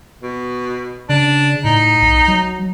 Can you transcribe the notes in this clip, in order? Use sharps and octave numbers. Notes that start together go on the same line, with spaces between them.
B2
C#3 D4
A2 D#4
B1
F#3